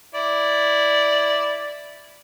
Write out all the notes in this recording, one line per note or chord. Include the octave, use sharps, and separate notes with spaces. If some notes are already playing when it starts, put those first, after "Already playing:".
E4 D5